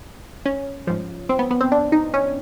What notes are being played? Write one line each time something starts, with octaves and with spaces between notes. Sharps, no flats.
C#4
G#2 F3
C4
B3
B3
C4
D4
D#4
C#4